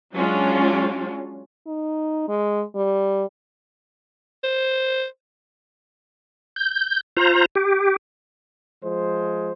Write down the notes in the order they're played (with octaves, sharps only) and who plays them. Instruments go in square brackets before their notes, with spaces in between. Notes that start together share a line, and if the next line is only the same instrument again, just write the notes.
[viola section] F#3 G#3 C#4 D4 F4 F#4
[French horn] D#4
G#3
G3
[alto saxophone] C5
[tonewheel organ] G6
F4 C5 A#5
G4
[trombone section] F3 G#3 C5